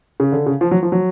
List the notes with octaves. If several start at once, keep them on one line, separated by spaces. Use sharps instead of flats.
C#3
D3
C#3
F3
F#3
F3
F#3